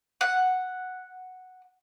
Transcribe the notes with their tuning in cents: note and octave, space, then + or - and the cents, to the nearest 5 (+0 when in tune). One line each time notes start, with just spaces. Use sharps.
F#5 +0